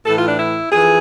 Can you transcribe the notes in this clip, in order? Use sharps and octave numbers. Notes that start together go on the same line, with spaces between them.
A2 E3 A4
F4
D4
E4
F2 E3 G#4